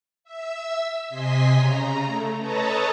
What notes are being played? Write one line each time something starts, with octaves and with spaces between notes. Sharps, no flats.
E5 E6
C3 D#5 G#5 C6 B6
C#3 A#5
A3
A4 B4 C#5 D#5 A5 A#5